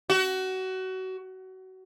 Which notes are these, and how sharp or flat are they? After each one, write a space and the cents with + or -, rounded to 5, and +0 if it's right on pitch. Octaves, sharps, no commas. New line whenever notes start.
F#4 +25